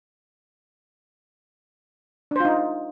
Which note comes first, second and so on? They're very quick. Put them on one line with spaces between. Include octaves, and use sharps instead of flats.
D4 C5 F4 D#4